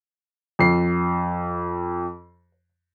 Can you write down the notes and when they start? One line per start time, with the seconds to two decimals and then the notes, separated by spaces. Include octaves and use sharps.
0.59 F2 C7